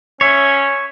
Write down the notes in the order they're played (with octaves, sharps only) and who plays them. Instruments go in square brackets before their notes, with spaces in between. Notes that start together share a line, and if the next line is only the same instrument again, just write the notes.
[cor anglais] C#4 [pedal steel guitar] C#5 E5